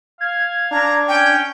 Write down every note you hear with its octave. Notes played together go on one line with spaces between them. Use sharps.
F5 G#6
D4 A#5
C#4 G5